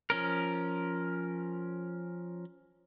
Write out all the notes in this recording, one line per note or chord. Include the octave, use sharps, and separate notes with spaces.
F3 C#4 A#4